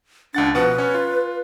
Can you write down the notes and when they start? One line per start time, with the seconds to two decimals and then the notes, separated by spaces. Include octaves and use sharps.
0.35 C#2 D4 F#5 A6
0.55 B2 F3 B4 F#5
0.78 C#4 C#5
0.94 F4